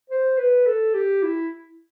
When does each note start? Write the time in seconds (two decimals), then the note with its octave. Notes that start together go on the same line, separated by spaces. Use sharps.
0.09 C5
0.38 B4
0.66 A4
0.94 G4
1.23 E4